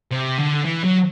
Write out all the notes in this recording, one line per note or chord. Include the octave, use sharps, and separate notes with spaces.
C3
D3
E3
F#3